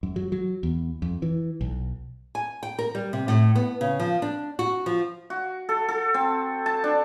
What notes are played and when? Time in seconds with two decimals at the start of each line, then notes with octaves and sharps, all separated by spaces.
0.03 F#2
0.16 F#3
0.32 F#3
0.63 E2
1.02 F2
1.22 E3
1.61 B1
2.35 G#5
2.63 G5
2.79 A#4
2.95 G3
3.13 C3
3.28 A2
3.55 B3
3.81 C#3
4.00 F3
4.22 D4
4.59 F#4
4.86 F3
5.30 F#4
5.69 A4
5.89 A4
6.14 C4
6.66 A5
6.84 D4